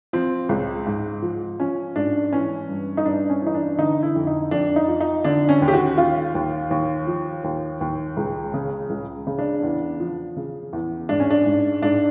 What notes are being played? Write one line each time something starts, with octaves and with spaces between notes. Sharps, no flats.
F3 C4
C#2
G#2
F3
F3 C#4
G#2 D4
E3 C#4
G2
D#4
G2 D4
C#4
E3 D#4
D4
D3 D#4
E4
F2
D#4
F2 D4
D#4
F3
D#4
D3 D4
C#4
D#2
G4
F#4
D#2 F4
D#2
D#2
F3
D#2
D#2
C#2
C#3
C#2
C#3
D4
E2
F3
C#3
E2
G#2 D4
C#4
D4
G#2
G#2 D4